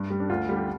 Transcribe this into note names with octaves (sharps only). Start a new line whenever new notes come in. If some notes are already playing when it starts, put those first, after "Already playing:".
Already playing: G2
G3
D4
D2 F4
D3 G3
G4